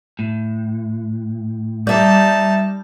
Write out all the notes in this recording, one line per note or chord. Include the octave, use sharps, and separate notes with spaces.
A2
G3 D#4 D5 E5 A5